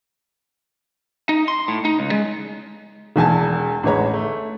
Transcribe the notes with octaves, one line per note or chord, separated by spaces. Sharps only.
D#4
C6
A2
D#4
C#2
G#3
E1 E2 G#5 A5
A1 D3 G#3 B4 C#5 A#5
A3